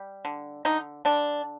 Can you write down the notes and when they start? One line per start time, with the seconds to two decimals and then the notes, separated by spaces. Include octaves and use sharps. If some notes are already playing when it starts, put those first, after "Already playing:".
Already playing: G3
0.25 D3
0.65 D3 D#4
1.05 D3 D4